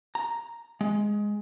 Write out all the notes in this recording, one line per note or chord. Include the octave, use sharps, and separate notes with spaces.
A#5
G#3